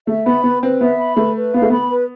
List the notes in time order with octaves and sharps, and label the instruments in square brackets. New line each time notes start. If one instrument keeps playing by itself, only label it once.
[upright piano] A3 [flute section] E5
[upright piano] B3 [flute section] B5
[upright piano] B3 [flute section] B4
[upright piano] C4 [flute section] B4
[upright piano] B3 [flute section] E5
[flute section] B5
[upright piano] A3 [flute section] B4
[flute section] B4
[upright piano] B3 [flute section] F5
[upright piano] A3
[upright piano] B3 [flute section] B5
[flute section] B4